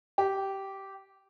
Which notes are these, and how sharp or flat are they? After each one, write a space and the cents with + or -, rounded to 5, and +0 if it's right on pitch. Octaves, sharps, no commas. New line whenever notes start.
G4 -15